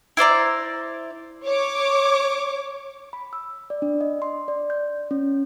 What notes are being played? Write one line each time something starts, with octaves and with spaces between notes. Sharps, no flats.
E4 C5 D5 A#5
C#5 D6
B5
E6
D5
D4
D#5
C6
D5
G6
C#4